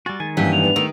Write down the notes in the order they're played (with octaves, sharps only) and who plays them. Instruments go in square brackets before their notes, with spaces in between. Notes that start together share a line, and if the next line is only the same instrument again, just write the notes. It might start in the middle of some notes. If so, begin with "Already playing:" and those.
[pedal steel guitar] G3 F#4 [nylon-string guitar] G#5 [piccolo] A6
[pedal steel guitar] D#3 G#5 [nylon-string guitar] G#3
[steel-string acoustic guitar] G2 E3 G4 [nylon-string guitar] F#3 A#3 C#4 [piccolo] B6
[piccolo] F7
[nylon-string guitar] B3 D4
[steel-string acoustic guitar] D#3 [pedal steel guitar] A3